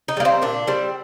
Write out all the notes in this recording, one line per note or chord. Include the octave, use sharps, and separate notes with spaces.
D#4
G3 A#3
C4
A#2 D4
G3 C4